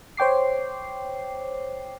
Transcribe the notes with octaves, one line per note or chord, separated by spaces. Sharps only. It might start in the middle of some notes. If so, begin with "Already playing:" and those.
C5 C#5 G5 D6 C7